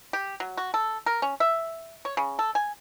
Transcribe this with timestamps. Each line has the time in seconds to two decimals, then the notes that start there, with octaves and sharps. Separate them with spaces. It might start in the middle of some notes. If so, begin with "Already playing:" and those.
0.13 G4
0.40 F#3
0.57 F#4
0.74 A4
1.06 A#4
1.22 C#4
1.40 E5
2.05 C#5
2.17 C#3
2.39 A4
2.55 G#5